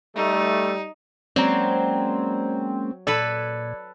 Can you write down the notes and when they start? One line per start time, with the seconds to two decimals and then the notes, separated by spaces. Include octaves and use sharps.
0.16 G3 A3 D#4
1.36 F#3 G#3 A#3 C4 C#4 D5 A#5
3.07 A#2 A4 B4 D5 B5